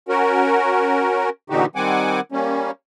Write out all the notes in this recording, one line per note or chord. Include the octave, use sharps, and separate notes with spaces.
C#4 F#4 A#4
A#2 D3 E3 D#4 F#4 G4
D#3 G3 C4 F#5 G#5 D6
G3 A#3 C#4